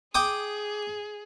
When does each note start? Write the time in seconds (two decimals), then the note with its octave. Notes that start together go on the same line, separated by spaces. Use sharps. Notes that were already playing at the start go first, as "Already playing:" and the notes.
0.15 G#4 G5 D6 D#6